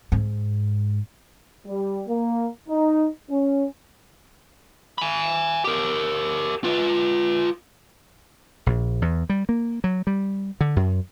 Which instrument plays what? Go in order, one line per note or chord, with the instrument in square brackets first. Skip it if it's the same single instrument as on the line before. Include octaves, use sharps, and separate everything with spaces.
[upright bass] G#2
[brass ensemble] G3
A#3
D#4
C#4
[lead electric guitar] G#5 B5
G4 A#4
F4 B4
[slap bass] A#1
E2
G3
A#3
F#3
G3
D3
F#2